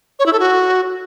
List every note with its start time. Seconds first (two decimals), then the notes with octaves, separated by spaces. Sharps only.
0.19 C#5
0.26 E4
0.33 A4
0.40 F#4